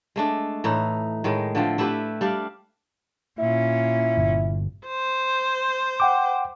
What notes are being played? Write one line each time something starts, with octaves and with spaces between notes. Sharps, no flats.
G#3 A3 D4
A2 E3 D#4
A2 D#3 G#3
D3 F3 A3 C4
A3 E4 G4 B4
G3 D4 F5
A#2 C#4 E4
G1
C5
F#5 G5 D6